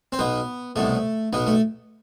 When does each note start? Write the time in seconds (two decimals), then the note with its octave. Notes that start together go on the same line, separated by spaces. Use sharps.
0.12 C4
0.19 B1 B2 B3
0.76 C2 B2 A3
1.33 B1 B2 B3
1.47 A3